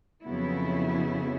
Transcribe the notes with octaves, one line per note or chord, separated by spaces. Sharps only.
F2 C#3 F#3 B3 E4